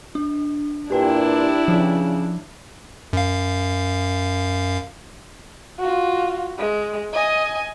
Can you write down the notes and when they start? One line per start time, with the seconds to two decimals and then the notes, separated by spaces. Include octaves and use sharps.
0.15 D4
0.91 A#2 D4 E4 G4 B4 G5
1.68 C#3 F3
3.13 F#2 F5
5.79 F4 F#4
6.58 G#3
7.13 D#5 G#5